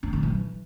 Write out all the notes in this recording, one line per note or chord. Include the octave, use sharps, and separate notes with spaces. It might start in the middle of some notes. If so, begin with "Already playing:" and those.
C#4
D3
E3